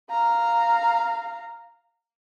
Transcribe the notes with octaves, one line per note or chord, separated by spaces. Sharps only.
F5 A#5